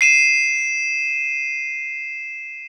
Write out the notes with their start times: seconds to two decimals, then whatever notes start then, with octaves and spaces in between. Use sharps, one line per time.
0.01 C7 D#7 E7